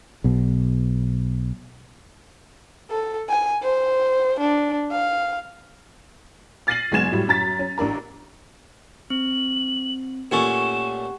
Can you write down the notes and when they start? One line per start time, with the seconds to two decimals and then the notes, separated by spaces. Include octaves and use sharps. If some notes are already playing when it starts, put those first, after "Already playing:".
0.24 B1 B2
2.91 A4
3.29 G#5
3.63 C5
4.41 D4
4.92 F5
6.67 F6 A6 A#6 C7 D#7 F#7
6.92 F#1 G#3 B3 G#5 G#6 E7
7.12 A2 F#3 G3
7.28 F#2 A#5 A6 B6
7.59 C#4
7.78 A1 D4 A#4 A#5
9.10 C4 F#7
10.31 A#2 A3 C#4 G4 F#5 C#6 E7